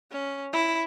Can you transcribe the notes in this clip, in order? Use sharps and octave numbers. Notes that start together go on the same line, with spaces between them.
C#4
E4